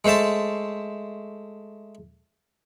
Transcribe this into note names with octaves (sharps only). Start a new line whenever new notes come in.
G#3 A3 C5 E5 A5